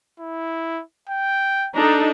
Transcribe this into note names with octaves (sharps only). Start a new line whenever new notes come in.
E4
G5
D4 D#4 A4 A#5